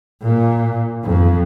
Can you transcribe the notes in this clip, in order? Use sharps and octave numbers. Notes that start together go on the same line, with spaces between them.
A#2
F2